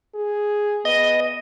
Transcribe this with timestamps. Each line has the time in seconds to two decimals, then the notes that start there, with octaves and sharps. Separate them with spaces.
0.15 G#4
0.85 B3 D#5